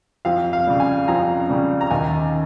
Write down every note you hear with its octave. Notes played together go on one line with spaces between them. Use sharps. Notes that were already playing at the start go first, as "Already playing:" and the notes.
F2 F5
F5
C#3 G3
G#5
F2 A#5
C#3 G3
A#5
D#2 G#5